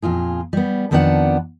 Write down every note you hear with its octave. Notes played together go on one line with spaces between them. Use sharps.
F2 A#2 F4 G#4
G3 B3
F2 D#3 B3 D4 D5 F#5